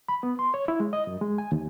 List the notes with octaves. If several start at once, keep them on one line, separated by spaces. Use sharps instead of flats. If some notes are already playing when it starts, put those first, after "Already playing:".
B5
B3
C6
C#5
E4
G#3
D#5
F#2
G#3
G#5
D#2